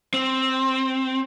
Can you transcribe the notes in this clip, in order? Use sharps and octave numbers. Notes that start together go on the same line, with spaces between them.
C4